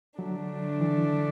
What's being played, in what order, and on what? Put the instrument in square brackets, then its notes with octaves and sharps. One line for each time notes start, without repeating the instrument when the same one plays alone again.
[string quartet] D3 A3 D4 [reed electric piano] F#3
[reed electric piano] E3